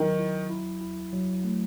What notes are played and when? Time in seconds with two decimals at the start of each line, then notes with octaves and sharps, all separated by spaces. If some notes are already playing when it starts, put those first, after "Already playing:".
Already playing: D#3 F#3
0.19 E4
0.50 E4
0.81 E4
1.13 F#3
1.44 A3